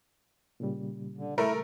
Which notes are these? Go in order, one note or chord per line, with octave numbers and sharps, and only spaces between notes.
A#2 C#3 G3
D3
A3 E4 A#4